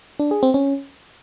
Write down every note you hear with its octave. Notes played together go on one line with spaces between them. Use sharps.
D4
G#4
C4
C#4